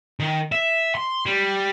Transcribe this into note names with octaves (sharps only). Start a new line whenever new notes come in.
D#3
E5
C6
G3